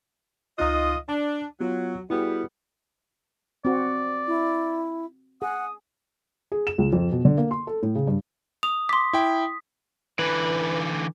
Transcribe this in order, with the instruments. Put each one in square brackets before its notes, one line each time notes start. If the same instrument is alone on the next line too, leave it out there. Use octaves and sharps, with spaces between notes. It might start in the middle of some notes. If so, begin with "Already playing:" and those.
[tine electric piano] C#2 D#4 F#6 [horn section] F4 D#5
[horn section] D4 [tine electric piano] A5
[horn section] F#3 [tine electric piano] B3 F4 F#4
[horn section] G3 B3 [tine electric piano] E4 F#4 G#4
[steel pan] C4 F#4 [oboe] D5
[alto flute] E4
[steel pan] G#4 [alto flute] F#5 [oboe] D#6
[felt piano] G#4
E7
C#2
F2
B2
D3
A#3
C6
A4
A2
C#3
G2
[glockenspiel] D#6 [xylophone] F7
[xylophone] C6 D6 [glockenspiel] B6
[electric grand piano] E4 G5
[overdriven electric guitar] D3 E3 [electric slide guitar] B4